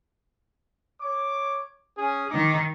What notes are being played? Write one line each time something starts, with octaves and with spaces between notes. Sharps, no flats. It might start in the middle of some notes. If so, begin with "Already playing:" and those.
C#5 D6
C#4 G#4
D#3 D#4 D6